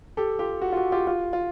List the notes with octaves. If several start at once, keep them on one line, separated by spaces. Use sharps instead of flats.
G4 A4
F4 G4
F#4
F4
F#4
F4 G4
F4
F4